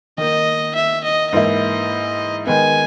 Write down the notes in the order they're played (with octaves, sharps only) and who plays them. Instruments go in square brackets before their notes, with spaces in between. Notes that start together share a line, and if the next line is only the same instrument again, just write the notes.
[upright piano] D#3 A#3 D#4 [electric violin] D#5
[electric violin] E5
D#5
[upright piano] G#2 E3 A#3 E4 [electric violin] D#5
[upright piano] D#3 G#3 B3 [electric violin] G#5